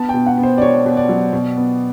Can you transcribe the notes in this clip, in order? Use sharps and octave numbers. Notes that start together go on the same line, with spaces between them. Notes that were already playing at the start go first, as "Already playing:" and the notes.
Already playing: B3 A5
G5
B2
F#5
B3
C5
D5
B2 C#5
B2
D5
F#3
B2
B3